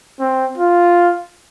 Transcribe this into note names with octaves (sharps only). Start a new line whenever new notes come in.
C4
F4